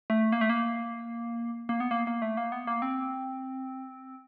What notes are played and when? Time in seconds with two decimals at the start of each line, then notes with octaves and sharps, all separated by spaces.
0.10 A3
0.32 A#3
0.41 A3
0.50 A#3
1.69 A#3
1.80 B3
1.91 A#3
2.07 A#3
2.22 A3
2.37 A#3
2.52 B3
2.67 A#3
2.82 C4